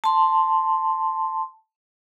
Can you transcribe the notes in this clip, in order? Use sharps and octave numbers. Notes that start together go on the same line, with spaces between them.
A5 C6